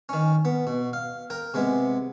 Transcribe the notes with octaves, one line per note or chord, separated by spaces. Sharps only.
D#3 C#4
B3
B2
F5
A#4 G5
C3 G#3 B3